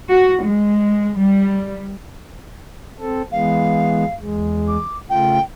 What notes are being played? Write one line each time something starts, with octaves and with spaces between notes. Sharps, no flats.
F#4
G#3
G3
C4 A4
E3 G#3 B3 F5
E2 G#3
D6
C#3 A3 F4 G5